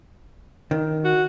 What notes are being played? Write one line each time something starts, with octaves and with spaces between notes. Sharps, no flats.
D#3
F#4